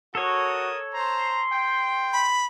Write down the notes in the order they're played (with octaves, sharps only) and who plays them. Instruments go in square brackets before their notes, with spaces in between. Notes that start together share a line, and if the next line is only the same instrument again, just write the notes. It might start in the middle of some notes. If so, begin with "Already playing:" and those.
[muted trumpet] F#4 [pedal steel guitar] A4 C#5 [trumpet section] A#4 D#6
[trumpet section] C5 A#5 [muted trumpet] C6
[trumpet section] G5
[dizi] B5